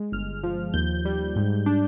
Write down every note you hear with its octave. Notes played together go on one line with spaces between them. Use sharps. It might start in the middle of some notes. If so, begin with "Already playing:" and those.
Already playing: G#3
G1 F6
F3
D#2 G6
G3
G#2
D4